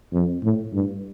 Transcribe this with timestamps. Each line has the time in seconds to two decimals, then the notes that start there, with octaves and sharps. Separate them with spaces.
0.13 F2
0.44 A2
0.74 G2